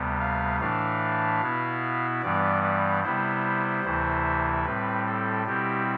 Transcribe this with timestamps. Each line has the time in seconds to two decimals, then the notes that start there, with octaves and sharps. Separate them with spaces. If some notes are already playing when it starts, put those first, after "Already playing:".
Already playing: D2 C3 G3 B3
0.20 F5
0.60 A2 E3 A3 D4 F5
1.41 B2 B3 E4
2.22 G2 E3 G3 B3 D5
2.63 D5
3.03 C3 G3 B3 E4 C5
3.84 D2 C3 E3 A3 E4
4.65 A2 G3 C4 B4
5.06 A4
5.46 B2 G3 C4 E4 G4